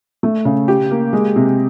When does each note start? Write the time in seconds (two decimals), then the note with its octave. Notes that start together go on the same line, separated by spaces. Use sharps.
0.23 A3
0.45 C#3
0.68 G4
0.91 A#3
1.13 G#3
1.36 C3